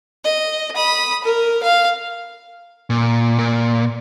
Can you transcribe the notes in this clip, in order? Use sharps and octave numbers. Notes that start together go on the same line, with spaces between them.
D#5
B5 D#6
A#4
F5
A#2
A#2